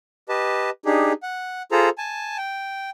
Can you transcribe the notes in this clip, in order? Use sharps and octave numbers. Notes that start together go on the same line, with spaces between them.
G4 B4 D#5 A5
D4 D#4 G4 G#4
F#5
F4 G#4 A4 C5 A#5
G#5 A5
G5